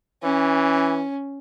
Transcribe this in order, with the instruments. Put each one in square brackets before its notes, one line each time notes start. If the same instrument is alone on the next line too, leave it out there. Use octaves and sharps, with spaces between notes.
[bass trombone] E3 [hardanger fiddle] C#4